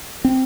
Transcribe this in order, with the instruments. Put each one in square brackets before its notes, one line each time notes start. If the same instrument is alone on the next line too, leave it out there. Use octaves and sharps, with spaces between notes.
[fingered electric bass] C4